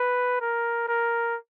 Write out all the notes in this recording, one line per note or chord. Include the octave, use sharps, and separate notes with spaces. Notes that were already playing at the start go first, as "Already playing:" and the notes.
Already playing: B4
A#4
A#4